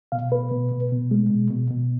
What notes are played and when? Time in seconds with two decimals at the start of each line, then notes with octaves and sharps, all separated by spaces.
0.12 B2 F5
0.32 B2 B4
0.52 B2
0.72 B2
0.92 B2
1.11 G#3
1.30 B2
1.51 B2
1.70 B2